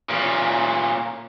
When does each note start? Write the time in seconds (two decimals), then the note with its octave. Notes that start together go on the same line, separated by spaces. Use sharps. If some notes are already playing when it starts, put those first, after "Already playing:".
0.10 A#2 C#4